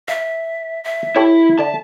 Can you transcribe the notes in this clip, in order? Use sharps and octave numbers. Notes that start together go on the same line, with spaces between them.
E5 F5
E5
E4 G4 A4 C#5
D3 D5 A5